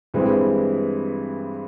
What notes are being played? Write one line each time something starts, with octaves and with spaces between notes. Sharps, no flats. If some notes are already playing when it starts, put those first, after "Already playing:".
G2 E3 G#3 C4 E4